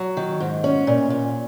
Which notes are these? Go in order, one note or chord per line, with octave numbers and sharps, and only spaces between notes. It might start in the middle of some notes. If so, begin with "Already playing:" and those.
Already playing: F#3
D#3
G#2
C#4
A#2
A#2